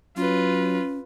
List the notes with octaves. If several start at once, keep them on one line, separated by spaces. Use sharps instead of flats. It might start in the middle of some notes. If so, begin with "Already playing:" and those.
F#3 C#4 F4 B4